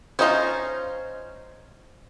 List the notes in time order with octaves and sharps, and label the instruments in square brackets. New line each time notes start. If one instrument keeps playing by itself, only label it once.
[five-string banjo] C#4 D#4 F4 [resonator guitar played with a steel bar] C5 D#5